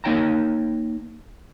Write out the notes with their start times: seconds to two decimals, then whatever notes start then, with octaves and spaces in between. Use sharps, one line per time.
0.04 A#3 D#4 C#5 G5 A5 A#5